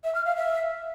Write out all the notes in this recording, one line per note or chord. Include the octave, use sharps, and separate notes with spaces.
E5
F6
F5
E5